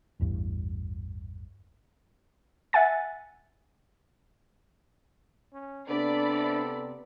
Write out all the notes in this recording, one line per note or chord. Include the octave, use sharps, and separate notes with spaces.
A1 E2 G2
E5 F#5 G#5 A6
C#4
C3 B3 D4 A4 D5 B5